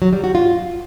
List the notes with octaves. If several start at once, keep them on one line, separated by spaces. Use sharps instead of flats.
F#3
G3
F#4
F4